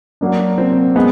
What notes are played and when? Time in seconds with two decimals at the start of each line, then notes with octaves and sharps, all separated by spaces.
0.21 F#3 A#3 D4
0.58 C4
0.96 G#3 B3